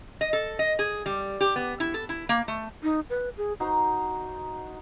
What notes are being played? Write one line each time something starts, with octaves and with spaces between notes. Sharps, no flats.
D#5
A4
D#5
G#4
G3
G4
B3
E4
A4
E4
A#3
A3
D#4
B4
G#4
D#4 F#4 C5